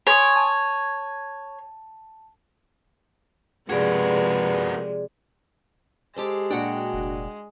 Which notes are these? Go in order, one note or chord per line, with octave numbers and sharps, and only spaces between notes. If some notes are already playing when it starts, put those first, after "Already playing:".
C#5 G#5 C6 D#6
A5
C3 F3 G#3 A#3 F#4 G#4 B4 D5
G#3 G4 A4 C5
A#2 D4 F#4 G5
F1